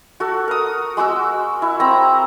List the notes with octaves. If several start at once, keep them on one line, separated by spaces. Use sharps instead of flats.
F#4 A4
A#4 D#6
G#3 F#4 D6 E6
E4
C4 A#5 E6